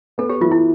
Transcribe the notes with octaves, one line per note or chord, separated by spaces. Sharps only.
B3 A4
G4
E3 F4
E4